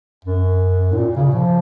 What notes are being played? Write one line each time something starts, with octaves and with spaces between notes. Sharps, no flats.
F#2
A2
A#2
C#3
F3